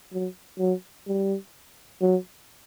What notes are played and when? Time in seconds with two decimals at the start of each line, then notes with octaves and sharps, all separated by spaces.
0.12 F#3
0.59 F#3
1.07 G3
2.02 F#3